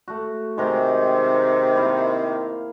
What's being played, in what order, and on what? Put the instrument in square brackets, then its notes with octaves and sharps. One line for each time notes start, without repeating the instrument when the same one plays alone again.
[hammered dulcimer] A3 F#4
[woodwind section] C3 D#3 [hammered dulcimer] G#3 A#4
[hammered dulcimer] A#3 E4 F5